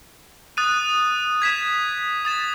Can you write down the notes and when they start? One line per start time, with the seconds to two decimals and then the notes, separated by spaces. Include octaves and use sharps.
0.57 D#6 F#6 A6 D#7
1.42 G#6 B6 E7
2.25 D#6 A6 E7